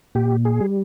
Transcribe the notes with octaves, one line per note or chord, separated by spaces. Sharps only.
A#2 G4
G#4
G3